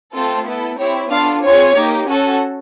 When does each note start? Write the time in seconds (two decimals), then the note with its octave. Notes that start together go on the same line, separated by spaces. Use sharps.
0.13 A3 C4 F4 A4
0.46 B3 E4 A4
0.78 C4 E4 G4 C#5
1.11 B3 D4 F4 A4 F5
1.43 C4 F4 G#4 C#5
1.75 A#3 D#4 G4
2.08 C#4 F#4 A4